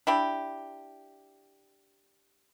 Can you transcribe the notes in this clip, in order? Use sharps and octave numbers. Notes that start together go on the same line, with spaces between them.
D4 E4 G4